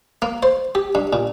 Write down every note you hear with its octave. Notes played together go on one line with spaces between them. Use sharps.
A#3
C5
G4
G2
A#2